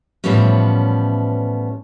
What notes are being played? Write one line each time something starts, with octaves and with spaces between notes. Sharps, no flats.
A2 E3 F3 G3 B3 C#4